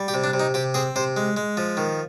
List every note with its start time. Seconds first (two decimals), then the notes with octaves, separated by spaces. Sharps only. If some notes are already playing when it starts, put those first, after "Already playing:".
Already playing: G3
0.08 G4
0.14 C3
0.24 D4
0.34 C3
0.40 D#4
0.54 C3 G4
0.74 C4 G#4
0.96 C3 C5
1.17 G#3
1.37 G#3
1.57 F3
1.77 D#3